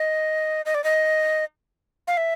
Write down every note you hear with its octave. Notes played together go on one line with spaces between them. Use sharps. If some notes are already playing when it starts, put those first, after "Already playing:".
Already playing: D#5
D#5
D5
D#5
F5
E5